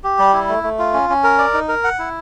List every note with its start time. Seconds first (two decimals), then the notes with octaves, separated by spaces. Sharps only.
0.04 G4
0.18 G3
0.33 E4
0.49 A3
0.63 A3
0.79 F4
0.94 C#4
1.09 C#4
1.24 A#4
1.38 D5
1.54 D#4
1.68 A#4
1.84 F#5
1.99 E4